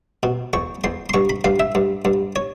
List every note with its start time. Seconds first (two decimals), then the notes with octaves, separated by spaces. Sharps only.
0.23 B2
0.53 E2 C#6
0.84 E2 C6
1.09 C6
1.14 G2 C#6
1.30 B5
1.44 G2 F5
1.60 E5
1.75 G2
2.05 G2
2.36 C#5